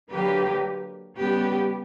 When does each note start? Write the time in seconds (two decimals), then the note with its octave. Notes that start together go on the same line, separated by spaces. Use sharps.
0.11 D3 F#3 A#3 G4 B4
1.16 C#3 G3 B3 G4 B4